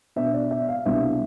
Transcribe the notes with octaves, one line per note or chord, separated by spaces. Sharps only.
B2 B3 D4 E5
D5
E5
F5
C2 B2 B3 D4 E5